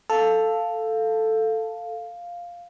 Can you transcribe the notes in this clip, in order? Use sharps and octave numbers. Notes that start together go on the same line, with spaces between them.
A4 F5